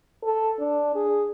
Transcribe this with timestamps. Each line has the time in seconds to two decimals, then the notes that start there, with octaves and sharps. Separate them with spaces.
0.24 A4
0.59 D4
0.95 G#4